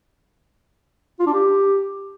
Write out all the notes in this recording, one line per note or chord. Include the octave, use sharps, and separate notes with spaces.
F4
D4
G4